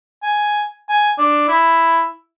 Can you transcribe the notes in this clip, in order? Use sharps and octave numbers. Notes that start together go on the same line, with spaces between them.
G#5
G#5
D4
E4